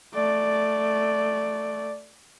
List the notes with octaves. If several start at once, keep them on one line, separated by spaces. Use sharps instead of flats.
A3 D5